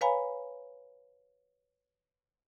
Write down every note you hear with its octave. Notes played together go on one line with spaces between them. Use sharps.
B4 C#5 F5 G#5 A#5 B5